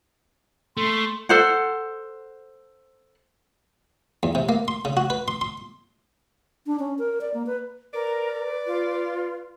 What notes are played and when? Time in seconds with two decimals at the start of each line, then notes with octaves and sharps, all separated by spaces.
0.77 A3 C6
1.29 A4 C5 F#5
4.23 E2
4.35 C3
4.49 A#3
4.68 C6
4.85 C#3
4.97 F#4
5.10 B4
5.28 C6
5.41 C6
6.66 D4
6.79 C#4
6.99 A#4
7.21 D5
7.34 A#3
7.46 B4
7.94 A#4 B4 D5
8.67 F4